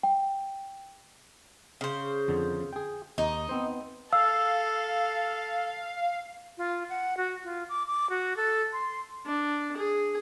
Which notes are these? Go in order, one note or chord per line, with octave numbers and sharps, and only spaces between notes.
G5
C#3 C5
F2 D3
G#4 G5
D#2 D#4
B3 C4 C5
A4 F5 E6
F4
F#5
F#4
F4
D6
D6
F#4
A4
C6
D4
G#4